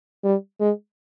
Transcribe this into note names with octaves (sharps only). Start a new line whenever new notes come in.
G3
G#3